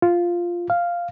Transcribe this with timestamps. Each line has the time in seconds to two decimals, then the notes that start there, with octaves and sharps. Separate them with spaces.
0.02 F4
0.70 F5